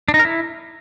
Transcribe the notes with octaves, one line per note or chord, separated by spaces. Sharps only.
D4
D#4
A#4
E4